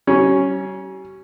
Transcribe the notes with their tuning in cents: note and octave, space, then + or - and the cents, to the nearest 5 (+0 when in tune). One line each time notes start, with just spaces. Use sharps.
G3 -45 C#4 +0